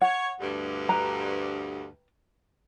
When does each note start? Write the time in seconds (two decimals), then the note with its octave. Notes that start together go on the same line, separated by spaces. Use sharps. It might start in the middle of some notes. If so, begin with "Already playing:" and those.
0.01 C#5 F#5
0.40 D2 G2
0.89 B4 G5 A#5